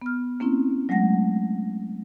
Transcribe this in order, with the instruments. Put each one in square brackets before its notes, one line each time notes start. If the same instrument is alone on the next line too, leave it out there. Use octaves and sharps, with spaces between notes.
[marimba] B3 F6
A#3 C4 C#4 E4
F#3 G#3 A3 F#5 A#6